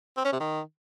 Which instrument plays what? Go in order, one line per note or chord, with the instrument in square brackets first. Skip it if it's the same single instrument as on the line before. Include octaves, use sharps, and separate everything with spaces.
[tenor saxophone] C4
C#4
C3
D#3